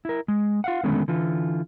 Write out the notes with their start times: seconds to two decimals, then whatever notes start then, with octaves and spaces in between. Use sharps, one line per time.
0.05 E4 A#4
0.28 G#3
0.64 F4 F5 F#5
0.84 D3 D#3 G#3 A3 B3 C#4
1.08 D3 E3 F4